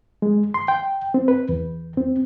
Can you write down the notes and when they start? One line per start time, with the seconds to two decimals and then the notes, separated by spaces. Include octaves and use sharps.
0.22 G#3
0.54 C6
0.68 G5
1.14 C4
1.28 B4
1.49 E2
1.97 C4